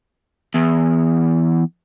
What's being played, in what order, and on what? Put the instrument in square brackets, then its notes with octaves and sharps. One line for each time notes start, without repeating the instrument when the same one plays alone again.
[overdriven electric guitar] E2